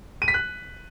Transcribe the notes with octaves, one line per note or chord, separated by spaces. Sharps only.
D#7
B6
F#6